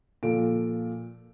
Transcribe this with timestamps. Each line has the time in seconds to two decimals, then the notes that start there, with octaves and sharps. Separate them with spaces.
0.23 A#2 F3 A4 D7